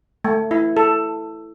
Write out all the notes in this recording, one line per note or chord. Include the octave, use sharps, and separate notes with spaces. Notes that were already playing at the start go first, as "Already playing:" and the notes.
A3
E4
A4